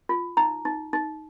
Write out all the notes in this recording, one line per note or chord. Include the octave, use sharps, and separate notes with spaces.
F4
D#4 A#5
D#4
D#4